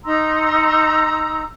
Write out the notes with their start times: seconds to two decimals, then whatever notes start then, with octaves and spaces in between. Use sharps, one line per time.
0.04 D#4 A#5 C6 E6